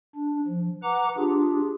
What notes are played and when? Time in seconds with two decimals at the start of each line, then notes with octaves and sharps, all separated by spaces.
0.15 D4
0.47 F3
0.83 B4 F#5 A#5 D6
1.17 D4 F4 G4 G#4